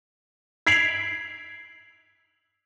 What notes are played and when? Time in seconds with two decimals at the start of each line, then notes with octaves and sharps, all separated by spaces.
0.67 G#6 B6 C7 D7 F7 F#7